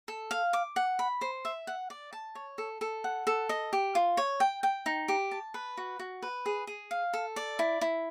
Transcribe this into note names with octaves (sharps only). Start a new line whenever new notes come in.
A4
F5
D6
F#5
B5
C5
E5
F#5
D5
A5
C#5
A4
A4
F#5
A4
D#5
G4
F4
C#5
G5
G5
D#4
G4
A5
B4
F#4
F#4
B4
G#4
G#4
F5
A4
D5
E4
E4